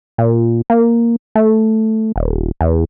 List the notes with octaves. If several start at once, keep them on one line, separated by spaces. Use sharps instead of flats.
A#2
A#3
A3
D#1
E2